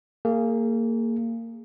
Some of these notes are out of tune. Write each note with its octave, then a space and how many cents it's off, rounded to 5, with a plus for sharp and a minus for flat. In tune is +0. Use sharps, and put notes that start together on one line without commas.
A#3 -25 G#4 +0